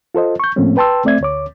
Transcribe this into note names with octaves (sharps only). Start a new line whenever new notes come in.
F4 A4 C5 D#5
C#6 G6
A2 F3 A3 A#3 C4 C#4
B4 G5 A5 C6 E6
A3 C4 D5 E5 G#6
D2 C#5 D6